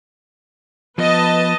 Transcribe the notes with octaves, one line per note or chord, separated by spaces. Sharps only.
F3 B3 B4 D#5 A5